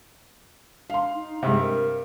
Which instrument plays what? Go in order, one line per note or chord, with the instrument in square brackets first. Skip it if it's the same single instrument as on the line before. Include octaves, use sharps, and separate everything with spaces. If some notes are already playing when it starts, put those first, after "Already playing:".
[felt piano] F5 C6
[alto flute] D#4
[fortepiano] G2 C3 [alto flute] G#3
[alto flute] A#4